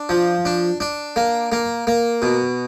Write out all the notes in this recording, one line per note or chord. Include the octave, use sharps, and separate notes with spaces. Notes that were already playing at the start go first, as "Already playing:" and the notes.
Already playing: D4
F3
D4
D4
A#3
A#3
A#3
B2